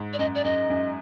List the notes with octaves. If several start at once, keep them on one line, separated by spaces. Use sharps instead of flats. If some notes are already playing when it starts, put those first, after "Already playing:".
Already playing: G#2
D5
F#2 D#5
D5
F#2 D#5
F#2